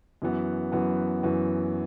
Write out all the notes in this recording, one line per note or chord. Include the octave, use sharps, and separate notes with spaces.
F#2 E3 B3 F#4
F#2 E3 B3 F#4
F#2 E3 B3 F#4